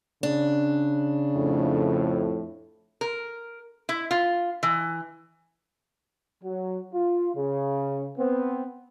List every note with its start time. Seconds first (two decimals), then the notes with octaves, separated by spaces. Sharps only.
0.23 C#3 D4
1.36 F2 A2
3.01 A#4
3.89 E4
4.11 F4
4.63 E3
6.44 F#3
6.94 F4
7.35 C#3
8.18 B3 C4